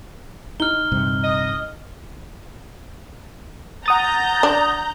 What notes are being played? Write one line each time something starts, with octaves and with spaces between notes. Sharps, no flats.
D#4 F6 G7
A#1 G2 C3
D#5
F#5 A#5 D#6 G6 A6
D4